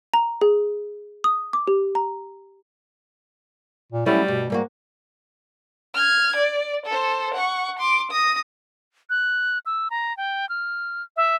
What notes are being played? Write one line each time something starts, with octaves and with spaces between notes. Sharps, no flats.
A#5
G#4
D#6
D6
G4
A#5
A#2
F#3 G3 A3 C#4 E4
G2 B2
G#2 G3 A#3 F#4
F6 G#6
D5
A4 C5
F#5 C#6
C6 D6
D#6 A#6
F#6
E6
A#5
G5
F6
E5